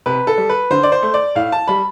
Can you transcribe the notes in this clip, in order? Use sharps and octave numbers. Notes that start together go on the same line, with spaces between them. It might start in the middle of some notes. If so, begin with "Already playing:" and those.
C3 B4
A4
G3
B4
D3 C5
D5
C5
A3
D5
A2 F5
A5
G3 B5